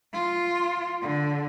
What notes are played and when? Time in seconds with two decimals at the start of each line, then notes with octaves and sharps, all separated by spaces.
0.13 F4
1.02 D3